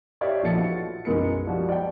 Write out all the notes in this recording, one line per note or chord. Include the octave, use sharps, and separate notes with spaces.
G4 C#5 D5 E5 F5
A#1 F3 A4 D#5 A6 C#7
F4 F#4 B4
B1 F#2 G#3 A#4 B4 C#7
F3 G3 F#4
D5 G5